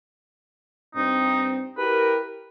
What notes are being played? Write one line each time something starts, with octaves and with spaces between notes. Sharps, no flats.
G2 C4 D#4
E4 G4 A#4 B4